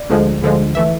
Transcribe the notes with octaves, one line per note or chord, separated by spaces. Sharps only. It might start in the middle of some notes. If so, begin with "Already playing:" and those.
Already playing: D5
D2 D3 F3 G#3
D2 D3 F3 G#3
E3 A3 E5